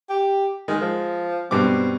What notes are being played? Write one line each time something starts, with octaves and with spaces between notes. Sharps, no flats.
G4
D#3 G#3
F3
G2 B2 C4 D6